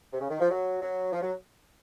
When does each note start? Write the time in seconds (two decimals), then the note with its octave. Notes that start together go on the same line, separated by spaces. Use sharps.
0.13 C3
0.21 C#3
0.30 D#3
0.40 F3
0.51 F#3
0.82 F#3
1.12 F3
1.22 F#3